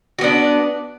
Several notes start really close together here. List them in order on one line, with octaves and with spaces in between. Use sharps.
F#4 B3 D4